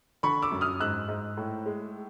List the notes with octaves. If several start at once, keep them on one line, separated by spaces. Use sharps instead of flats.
D3 B5 C#6
D6 E6
F#2
D#6 F6
G#2 E6 F#6
G#2
A2
G#3